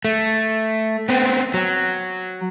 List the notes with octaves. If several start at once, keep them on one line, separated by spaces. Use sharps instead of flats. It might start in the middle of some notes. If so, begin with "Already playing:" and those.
A3
B3 C4
F#3